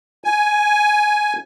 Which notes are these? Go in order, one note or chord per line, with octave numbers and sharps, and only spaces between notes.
G#5